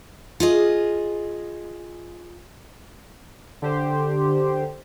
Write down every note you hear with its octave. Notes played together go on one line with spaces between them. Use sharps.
F4 G#4 D#5
D3 G4 C5